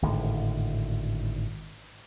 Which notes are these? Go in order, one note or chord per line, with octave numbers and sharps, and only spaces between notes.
G#1 A2 D3